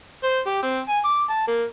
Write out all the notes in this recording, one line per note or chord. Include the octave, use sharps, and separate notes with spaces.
C5
G4
C4
G#5
D6
A5
A#3